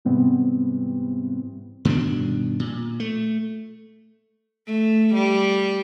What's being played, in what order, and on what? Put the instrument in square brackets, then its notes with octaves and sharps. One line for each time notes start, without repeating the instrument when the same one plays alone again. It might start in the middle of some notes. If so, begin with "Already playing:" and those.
[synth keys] G#2 C3 E3 G3 B3 C4
[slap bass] G2 B2 D#3 D4
A#2
A3
[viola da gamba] A3
G3